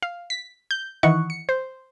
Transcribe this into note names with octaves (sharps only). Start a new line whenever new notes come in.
F5
B6
G6
D#3 E3 E4 D#5 F#5 C#6
C#7
C5